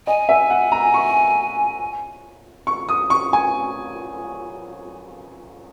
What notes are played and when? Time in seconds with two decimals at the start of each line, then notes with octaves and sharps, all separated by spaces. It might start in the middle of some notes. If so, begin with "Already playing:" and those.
0.07 D#5 G#5
0.29 E5
0.50 F#5
0.72 A#5
0.94 C#6
2.67 C#6
2.89 D#6
3.10 C#6
3.33 G#5